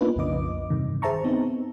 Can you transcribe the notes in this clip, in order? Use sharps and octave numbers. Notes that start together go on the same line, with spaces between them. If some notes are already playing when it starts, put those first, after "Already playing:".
A#3 B3 D4 D#4 F4 B4
B1 F2 C#3 D#5 D6
G2 C3 D#3
G#4 C5 E5 A5 A#5 C#6
B3 C4 D#4